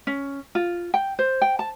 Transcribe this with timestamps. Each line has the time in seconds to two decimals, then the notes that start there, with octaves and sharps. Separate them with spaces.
0.07 C#4
0.55 F4
0.94 G5
1.19 C5
1.42 G5
1.59 A5